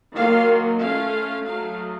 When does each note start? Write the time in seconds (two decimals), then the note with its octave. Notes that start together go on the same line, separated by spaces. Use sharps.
0.15 D#3 F#3 A#3 F4 F5
0.80 A3 C#4 F4 F5
1.44 F#3 A3 D#4 F5